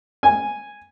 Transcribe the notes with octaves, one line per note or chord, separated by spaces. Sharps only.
G#5